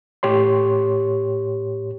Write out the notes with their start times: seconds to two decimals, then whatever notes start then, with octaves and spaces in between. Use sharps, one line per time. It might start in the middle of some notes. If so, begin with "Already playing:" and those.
0.23 A2 G4 C#5 C6